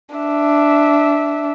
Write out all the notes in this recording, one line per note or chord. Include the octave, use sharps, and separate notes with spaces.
D4 E5